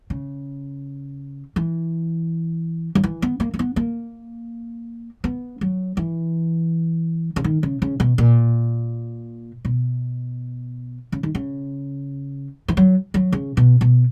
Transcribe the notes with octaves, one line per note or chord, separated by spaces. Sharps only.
C#3
E3
F#3
E3
B3
A#3
A#3
B3
A#3
B3
F#3
E3
C#3
D#3
C#3
C#3
B2
A#2
B2
C#3
D#3
C#3
E3
F#3
F#3
C#3
B2
B2